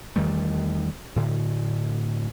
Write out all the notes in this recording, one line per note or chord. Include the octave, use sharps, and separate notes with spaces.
E2 D#3 G3 A3
A2 D3